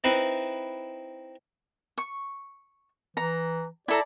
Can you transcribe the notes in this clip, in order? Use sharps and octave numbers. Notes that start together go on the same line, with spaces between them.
C4 D#4 E4 B4
C#6
E3 A#5
E4 A4 D5 A#5